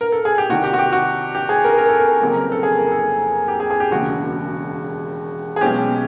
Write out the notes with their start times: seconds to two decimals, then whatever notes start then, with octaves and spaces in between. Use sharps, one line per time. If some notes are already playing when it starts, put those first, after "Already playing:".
0.01 A#4
0.12 A4
0.25 G#4
0.38 G4
0.49 C2 C3 D#3 F#4
0.64 G4
0.74 F#4
0.79 G4
0.93 F#4
1.35 G4
1.49 G#4
1.64 A#4
1.78 A#4
1.89 A4
1.99 A#4
2.21 F1 F2 C#3 F#3 A#3
2.40 A#4
2.52 A4
2.63 G#4
2.77 A#4
2.92 A4
3.48 G4
3.60 G#4
3.71 G#4
3.80 G4
3.91 E1 D#2 C#3 F#4
5.56 G#4
5.61 B1 B2 G#3 C#4 G4